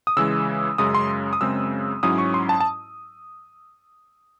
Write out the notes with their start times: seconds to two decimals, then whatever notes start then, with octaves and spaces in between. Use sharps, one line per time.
0.07 D#6
0.17 C#3 E3 G#3 E6
0.78 F#2 C#3 G#3 D#6
0.95 C6
1.33 D#6
1.41 F#2 C#3 G#3 C4 E6
2.03 G#2 F#3 C#4 E4 D#6
2.18 C#6
2.34 C6
2.49 A5
2.60 A5